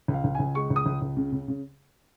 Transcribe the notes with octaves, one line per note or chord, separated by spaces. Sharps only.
C#2
F5
C#2
C#2 G#5
G#3 C#6
C#2
D#6
C#2
C#2
C#3
C#3
C#3